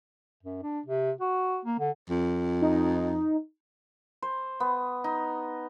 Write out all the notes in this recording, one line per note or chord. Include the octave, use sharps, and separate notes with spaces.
F#2
D4
C3
F#4
A#3
D3
F2
D#4
C5
B3
D#4